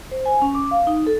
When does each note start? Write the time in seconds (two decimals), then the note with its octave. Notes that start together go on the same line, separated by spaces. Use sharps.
0.11 C5
0.26 G#5
0.42 C#4
0.55 D6
0.71 F5
0.87 D#4
1.07 A4